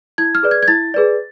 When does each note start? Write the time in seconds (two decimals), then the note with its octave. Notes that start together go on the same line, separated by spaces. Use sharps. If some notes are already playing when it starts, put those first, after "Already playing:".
0.18 E4 G#6
0.35 F6
0.43 G#4 B4 D5
0.51 G#6
0.63 G#6
0.68 E4 A6
0.94 G#4 B4 D5